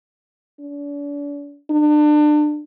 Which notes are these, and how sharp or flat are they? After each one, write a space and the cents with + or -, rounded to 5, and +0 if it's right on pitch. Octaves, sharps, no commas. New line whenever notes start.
D4 -40
D4 +30